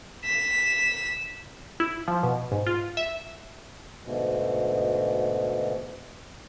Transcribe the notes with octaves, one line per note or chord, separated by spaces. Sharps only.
B6 E7
E4
F3
B2
G#2
F4
E5
D2 G#2 B2